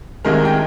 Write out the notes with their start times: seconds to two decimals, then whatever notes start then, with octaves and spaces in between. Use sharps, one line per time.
0.25 C2 C3 D#3 G#3 A#4
0.45 G5